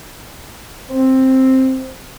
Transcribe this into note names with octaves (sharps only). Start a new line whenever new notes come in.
C4